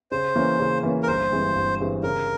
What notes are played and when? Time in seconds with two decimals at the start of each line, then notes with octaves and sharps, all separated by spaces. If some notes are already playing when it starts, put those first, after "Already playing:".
0.11 C#3 C5
0.35 E3 A#3 C#4
0.60 C#3
0.83 E3 A#3 C#4
1.03 A#4
1.08 G1 C5
1.32 G2 E3 G#3 C4
1.55 G1
1.79 G2 E3 G#3 C4
2.03 C#3 A#4